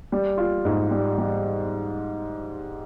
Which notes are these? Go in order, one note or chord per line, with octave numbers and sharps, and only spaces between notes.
G3
F4
G#2
G3
G3